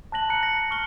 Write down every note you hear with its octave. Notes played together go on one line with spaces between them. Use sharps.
A5 F#6 A#6 F#7
A5 A#5 F#6 C#7
A#6
C#6 F6 C#7 G7